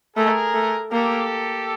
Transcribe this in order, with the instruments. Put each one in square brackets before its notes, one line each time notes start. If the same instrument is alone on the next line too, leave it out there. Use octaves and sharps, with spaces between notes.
[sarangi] A3 [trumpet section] G#4 A#4
[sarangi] A3
[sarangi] A#3 [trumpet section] G4 A4